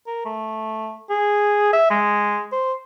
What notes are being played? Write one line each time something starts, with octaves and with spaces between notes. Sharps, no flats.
A#4
A3
G#4
E5
G#3
C5